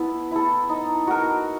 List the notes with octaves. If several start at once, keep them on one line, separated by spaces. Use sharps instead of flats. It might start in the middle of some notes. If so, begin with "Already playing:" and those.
Already playing: B3 E4 A4
E4 A4
D#4
F#4 A#4